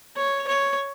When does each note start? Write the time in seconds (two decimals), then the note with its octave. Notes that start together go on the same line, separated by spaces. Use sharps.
0.17 C#5
0.48 C#5